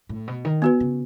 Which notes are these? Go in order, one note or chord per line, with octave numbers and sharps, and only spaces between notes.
A2
B2
D#3
B3 F#4 B4
C#3